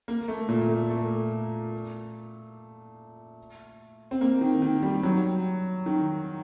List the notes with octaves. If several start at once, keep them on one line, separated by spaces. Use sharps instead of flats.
A#3
A3
A#2
A3
A3
C4
A#3
D#3
D#3
G3
F#3
D#3